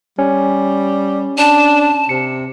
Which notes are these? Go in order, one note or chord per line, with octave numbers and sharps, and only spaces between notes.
G3 C#4
D4 A5
C3 C#7